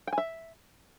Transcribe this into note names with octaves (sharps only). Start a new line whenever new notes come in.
G5
G#5
E5